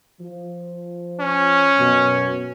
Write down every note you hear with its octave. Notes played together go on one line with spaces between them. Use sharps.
F3
C#4
F#2 B2